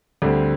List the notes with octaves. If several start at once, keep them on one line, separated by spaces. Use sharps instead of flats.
D2 D3 G3 C4